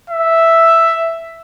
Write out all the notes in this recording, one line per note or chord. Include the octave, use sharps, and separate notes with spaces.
E5